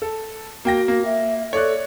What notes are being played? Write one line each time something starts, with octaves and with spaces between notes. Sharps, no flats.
A4
A#3 F#4 G5 A#6
A#3
E5
A4 C#5 D5 F#6